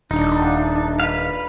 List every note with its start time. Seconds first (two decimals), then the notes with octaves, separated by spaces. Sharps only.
0.11 D#1 D4 D#4
1.00 B4 F5